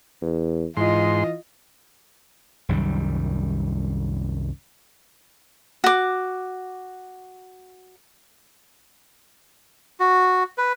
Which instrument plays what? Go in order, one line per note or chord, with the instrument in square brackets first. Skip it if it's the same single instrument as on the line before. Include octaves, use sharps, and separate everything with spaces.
[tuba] E2
[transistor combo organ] G#2 C6 [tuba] E3 [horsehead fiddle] F4 D#5
[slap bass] C2 F#2 D#3 G3
[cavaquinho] F#4 D6
[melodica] F#4
B4